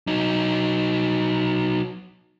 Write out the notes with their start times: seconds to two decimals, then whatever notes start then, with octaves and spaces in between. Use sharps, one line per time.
0.07 F#3 D#4